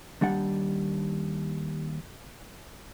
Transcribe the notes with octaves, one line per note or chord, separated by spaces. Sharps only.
D#2 G3 D4 F#5